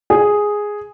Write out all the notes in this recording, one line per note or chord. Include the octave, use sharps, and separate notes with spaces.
G#4